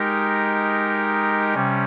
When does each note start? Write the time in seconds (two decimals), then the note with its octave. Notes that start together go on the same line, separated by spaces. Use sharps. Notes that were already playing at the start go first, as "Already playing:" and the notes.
Already playing: G#3 D#4 G4 A#4
1.54 C3 G3 C#4